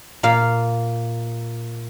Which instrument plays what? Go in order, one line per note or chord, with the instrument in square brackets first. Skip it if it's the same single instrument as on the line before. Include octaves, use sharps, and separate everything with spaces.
[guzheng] A#2 A#3 F5